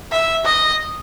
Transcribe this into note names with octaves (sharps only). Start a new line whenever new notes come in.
E5
D#5